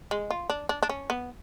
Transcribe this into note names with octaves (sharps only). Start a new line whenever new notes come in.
G#3
F4
D4
D4
D4
C#4
B3